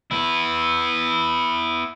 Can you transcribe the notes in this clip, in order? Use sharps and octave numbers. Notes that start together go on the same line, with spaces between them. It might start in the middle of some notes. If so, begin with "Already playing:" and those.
B3 E4